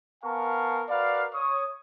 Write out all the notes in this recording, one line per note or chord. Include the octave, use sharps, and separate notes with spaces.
B3 A#4 F5 G#5 A5 C#6
F#4 A#4 B4 D5 F5
C#5 C#6 D#6